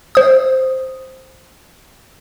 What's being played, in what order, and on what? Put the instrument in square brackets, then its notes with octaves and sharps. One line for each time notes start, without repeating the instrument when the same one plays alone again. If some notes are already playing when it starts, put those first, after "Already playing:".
[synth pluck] C5 D#6